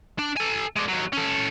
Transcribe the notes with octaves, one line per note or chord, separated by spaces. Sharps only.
D4
A4 G#5
G#3 D4
D#2 F#3
C#4 A4